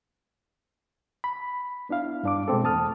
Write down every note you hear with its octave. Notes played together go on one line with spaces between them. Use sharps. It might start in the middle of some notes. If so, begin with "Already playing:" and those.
B5
B3 D4 E4 F5
G2 D4 D6
B2 G#3 C4 A4
E2 A3 A5 D#6 F6